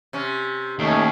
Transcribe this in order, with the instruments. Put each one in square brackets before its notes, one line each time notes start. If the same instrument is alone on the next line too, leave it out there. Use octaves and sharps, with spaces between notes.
[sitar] C3 C#4
[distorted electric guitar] D#2 [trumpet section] A3 C#4 D#4